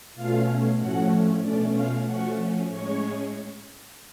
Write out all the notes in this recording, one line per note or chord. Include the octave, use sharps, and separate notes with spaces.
B2 A3 C#4 F4 F5
A2 F3 A3 C#4 F#4 F#5
B2 A3 C#4 D4 D5
F4 F5
F3 A3 C#4 F#4 F#5
A2 G#3 C#4 C#5 C#6